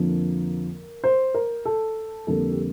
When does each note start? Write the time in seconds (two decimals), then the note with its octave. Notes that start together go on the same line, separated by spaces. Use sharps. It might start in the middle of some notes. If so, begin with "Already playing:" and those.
Already playing: F2 D3 F3 A#3 A#4
1.04 C5
1.34 A#4
1.65 A4
2.27 F2 D3 G3 A#3 A4
2.51 G4